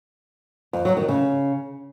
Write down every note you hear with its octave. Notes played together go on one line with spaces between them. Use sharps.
F2
F#3
D#3
C#3